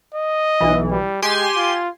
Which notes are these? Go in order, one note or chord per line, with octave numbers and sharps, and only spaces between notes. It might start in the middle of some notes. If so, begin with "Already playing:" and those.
D#5
B1 E3
G3
G#3 G4 G#5 C6
F4